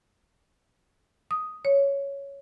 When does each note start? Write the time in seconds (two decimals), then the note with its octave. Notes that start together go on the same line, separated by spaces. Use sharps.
1.31 D#6
1.65 C#5